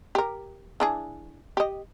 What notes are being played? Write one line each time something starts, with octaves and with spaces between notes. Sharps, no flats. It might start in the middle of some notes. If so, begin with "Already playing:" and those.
G4 A#4
E3 D4 G#4
G4 D#5